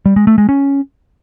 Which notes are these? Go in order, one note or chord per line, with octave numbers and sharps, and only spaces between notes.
G3
G#3
A3
G#3
C#4